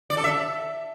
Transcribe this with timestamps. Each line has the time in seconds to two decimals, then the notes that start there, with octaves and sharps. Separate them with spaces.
0.10 D5
0.17 A4
0.24 E5